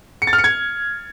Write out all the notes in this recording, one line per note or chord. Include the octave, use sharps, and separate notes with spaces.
C#7
A6
F6
C#7
G#6